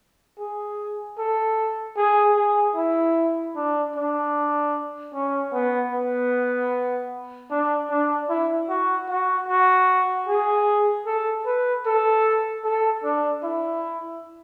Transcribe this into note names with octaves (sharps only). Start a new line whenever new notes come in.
G#4
A4
G#4
G#4
E4
D4
D4
C#4
B3
B3
D4
D4
E4
F#4
F#4
F#4
G#4
A4
B4
A4
A4
D4
E4